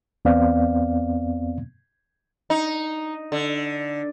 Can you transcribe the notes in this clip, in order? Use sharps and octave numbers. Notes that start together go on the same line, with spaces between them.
E2 B3 C4 D5 F5
D#4
D3